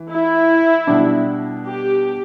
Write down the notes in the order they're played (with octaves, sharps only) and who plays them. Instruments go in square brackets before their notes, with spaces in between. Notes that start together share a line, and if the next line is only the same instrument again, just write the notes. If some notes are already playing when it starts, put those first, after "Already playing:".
Already playing: [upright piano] E3
[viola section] E4
[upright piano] B2 G3 D4
[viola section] G4